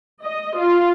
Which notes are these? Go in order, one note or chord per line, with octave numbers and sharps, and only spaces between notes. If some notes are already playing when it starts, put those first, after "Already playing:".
D#5
F4